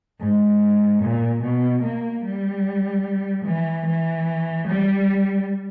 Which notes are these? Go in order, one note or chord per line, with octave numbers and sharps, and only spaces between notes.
G#2
A#2
B2
A#3
G3
E3
E3
G3